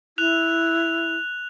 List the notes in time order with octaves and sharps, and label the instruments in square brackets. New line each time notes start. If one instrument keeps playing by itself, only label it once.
[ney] E4 [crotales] F#6 F7